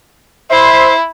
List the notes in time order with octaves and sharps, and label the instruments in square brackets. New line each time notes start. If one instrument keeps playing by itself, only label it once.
[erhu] E4 [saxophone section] C5 E5